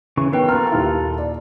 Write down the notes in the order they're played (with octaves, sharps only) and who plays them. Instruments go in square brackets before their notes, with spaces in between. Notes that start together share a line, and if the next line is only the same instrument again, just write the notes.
[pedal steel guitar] C#3 E3 C#6
[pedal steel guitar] D#3 F#3 G5 [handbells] B3 B4
[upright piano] A#3 C6 F6 [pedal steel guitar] F4 A4 [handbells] A#5
[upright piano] D#2 A#2 E4
D5